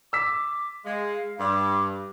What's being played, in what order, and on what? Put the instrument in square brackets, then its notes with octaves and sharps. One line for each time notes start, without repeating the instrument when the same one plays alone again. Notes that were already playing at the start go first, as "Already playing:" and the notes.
[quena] D6 [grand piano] E6 B6
[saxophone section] G#3 [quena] F5
[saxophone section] G2 [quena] D6